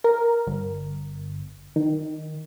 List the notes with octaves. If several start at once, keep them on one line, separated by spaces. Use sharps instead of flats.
A#4
G1
D#3